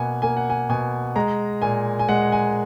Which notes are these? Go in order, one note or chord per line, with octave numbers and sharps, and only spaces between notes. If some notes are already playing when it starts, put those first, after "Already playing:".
Already playing: B2 A#3 F#5 G#5
A#3 G#5
F#5
G#5
B2 G#5
G#3 A#5
A#2 G#5
G#5
G#3 F#5
G#5